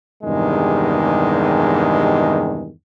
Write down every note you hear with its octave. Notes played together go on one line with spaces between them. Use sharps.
E2 G2 C3 D#3 G#3